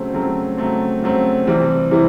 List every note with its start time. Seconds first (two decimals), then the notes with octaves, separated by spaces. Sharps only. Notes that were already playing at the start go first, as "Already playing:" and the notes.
Already playing: C#3 F#3 A3 C4
0.13 C#3 F#3 A3 C4
0.58 C#3 F#3 A3 C4
1.02 C#3 F#3 A3 C4
1.47 C3 E3 G3 C4 E4
1.91 C3 E3 G3 C4 E4